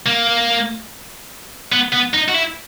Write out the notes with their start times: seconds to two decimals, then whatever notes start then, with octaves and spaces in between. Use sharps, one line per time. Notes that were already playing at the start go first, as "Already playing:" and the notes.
0.06 A#3
1.72 B3
1.93 B3
2.14 D#4
2.28 F#4
2.34 E4